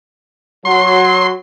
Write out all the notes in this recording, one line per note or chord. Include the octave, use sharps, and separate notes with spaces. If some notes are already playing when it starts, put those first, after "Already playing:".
F#3 C6